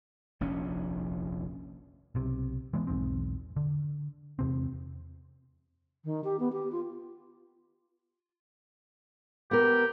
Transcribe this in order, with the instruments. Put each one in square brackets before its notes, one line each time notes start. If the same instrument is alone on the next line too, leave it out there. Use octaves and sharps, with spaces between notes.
[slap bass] F1 A#1 D#2 C#4
[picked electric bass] B1 C3
E3 G#3 B3
B1 E2 G#2 C4
D3
E2 C3 C4
[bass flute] D#3
G4
B3
G4
F4
[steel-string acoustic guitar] B3 A#4 [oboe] G4